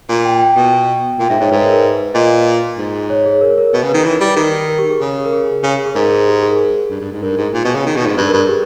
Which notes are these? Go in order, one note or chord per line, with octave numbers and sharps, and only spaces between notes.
A#2
G5
G5
B2 G5
A#2 G5
G#2 E5
G#2 C#5
G#2 B4
A#4
A#4
B4
A#2 D#5
G#2
C#5
G#4
A#4
A#4
B2 B4
C#3
B4
D#3
E3
G3
D#3
A#4
G4
G#4
C#3
A#4
G#4
C#3
G#4
G#2 A#4
G#4
G4
G#4
A#4
G#4
G2
G2
G#2
G2 A#4
G#2
A#2
B2
C#3
D#3
B2
G#2
G2 B4
A#4
G2 G#4
G4